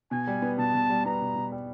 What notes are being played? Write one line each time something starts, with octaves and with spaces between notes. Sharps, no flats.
B2 G#5
G3
B3
B2 A5
B2
G3
B3 A#5
B2
B2
G3